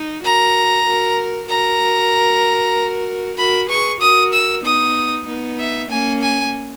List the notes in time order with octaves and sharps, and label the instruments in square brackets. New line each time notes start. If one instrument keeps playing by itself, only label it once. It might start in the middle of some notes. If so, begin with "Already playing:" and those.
Already playing: [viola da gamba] D#4
[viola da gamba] F#4 A#4 [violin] A#5
[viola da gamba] F#4 A#4
[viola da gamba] F#4 A#4 [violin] A#5
[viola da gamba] F#4 A#4 [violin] B5
[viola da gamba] G#4 B4 [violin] C#6
[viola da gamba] F#4 A#4 [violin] D#6
[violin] E6
[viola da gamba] B3 D#4 [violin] D#6
[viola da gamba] B3 D#4
[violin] E5
[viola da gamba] A#3 C#4 [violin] G#5
[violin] G#5